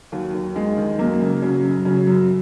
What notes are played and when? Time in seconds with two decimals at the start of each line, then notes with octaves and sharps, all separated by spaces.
0.12 D#2 F#3
0.34 D#2
0.55 D#3 G#3
0.77 D#3
0.98 F#2 A#3
1.21 C#3
1.42 C#3 F#3
1.64 F#2
1.85 C#3 F#3
2.07 F#2